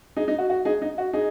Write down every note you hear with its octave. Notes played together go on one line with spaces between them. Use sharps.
D#4 G#4
D#4
F#4
F#4
D#4 G#4
D#4
F#4
D#4 G#4